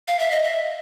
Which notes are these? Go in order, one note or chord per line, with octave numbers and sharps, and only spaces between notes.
F5
E5
D#5
E5